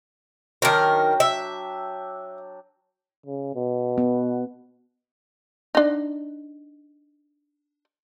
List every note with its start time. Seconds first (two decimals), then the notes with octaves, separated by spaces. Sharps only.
0.62 D#3 F#3 D4 A#4 G5
1.20 E5
3.26 C#3
3.55 B2
3.98 B3
5.75 D4 D#4